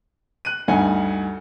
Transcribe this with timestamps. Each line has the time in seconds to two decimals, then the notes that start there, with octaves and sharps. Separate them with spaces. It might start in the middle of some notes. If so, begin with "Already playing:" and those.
0.45 F#6 D#7
0.68 D2 G2 D#4 F#5 G#5